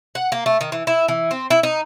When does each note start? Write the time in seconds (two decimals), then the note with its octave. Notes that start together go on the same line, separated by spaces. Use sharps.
0.15 F#5
0.32 A#3
0.46 A3
0.61 D#3
0.72 E3
0.87 E4
1.08 E3
1.31 C4
1.50 E4
1.63 D#4